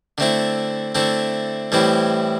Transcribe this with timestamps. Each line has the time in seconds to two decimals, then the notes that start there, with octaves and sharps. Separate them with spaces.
0.18 D3 A3 C4 E4
0.95 D3 A3 C4 E4
1.72 A2 E3 G3 C4 E4